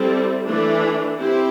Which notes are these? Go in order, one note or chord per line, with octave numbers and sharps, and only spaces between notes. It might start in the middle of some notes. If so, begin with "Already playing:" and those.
Already playing: G3 C4 E4 A4
E3 A3 D4
C4 E4 G4